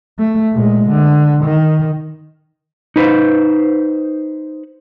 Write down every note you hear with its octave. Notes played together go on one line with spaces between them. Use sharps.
A3
A#2 G#3
D3
D#3
D#4 B4 C5